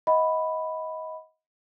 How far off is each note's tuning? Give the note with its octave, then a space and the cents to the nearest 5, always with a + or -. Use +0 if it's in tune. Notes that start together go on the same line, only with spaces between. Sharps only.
D#5 +30 F#5 -30 B5 +0